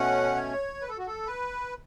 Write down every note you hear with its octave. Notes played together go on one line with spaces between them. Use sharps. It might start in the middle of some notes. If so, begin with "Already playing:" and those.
Already playing: B2 A3 C#4 F#5
C#5
B4
A4
F#4
A4
B4